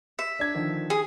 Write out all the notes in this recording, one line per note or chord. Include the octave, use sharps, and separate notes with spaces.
E5
D4 G#6
D3 D#3 F3
G#4